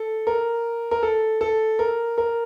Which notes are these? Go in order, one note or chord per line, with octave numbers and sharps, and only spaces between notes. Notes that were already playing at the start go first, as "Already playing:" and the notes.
Already playing: A4
A#4
A#4
A4
A4
A#4
A#4